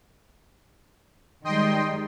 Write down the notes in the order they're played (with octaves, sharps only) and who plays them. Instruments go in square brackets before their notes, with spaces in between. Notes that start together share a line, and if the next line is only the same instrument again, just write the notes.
[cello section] D#3 G3 G#3 [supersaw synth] D#5 G5 C6